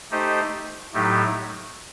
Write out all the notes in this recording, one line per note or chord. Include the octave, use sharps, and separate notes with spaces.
A3 D#4 G4 C5 D#5
A2 F#3 A3 D#4 G4